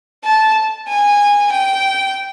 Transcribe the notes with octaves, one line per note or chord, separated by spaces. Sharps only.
A5
G#5
G5